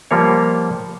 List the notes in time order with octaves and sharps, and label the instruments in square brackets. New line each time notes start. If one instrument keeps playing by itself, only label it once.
[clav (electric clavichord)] F3 G3 A#3 C#5